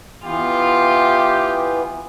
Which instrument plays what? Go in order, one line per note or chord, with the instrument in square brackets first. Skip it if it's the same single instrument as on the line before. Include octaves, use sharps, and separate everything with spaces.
[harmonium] E3 B3 [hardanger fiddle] F4 [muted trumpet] G4